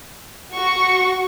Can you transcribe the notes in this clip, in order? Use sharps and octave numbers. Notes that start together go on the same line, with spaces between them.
F#4 C#6